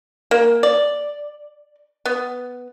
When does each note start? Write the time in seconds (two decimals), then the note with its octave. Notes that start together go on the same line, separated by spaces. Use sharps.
0.31 A#3
0.63 D5
2.05 B3